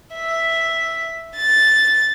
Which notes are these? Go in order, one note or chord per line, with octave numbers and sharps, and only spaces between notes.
E5
A6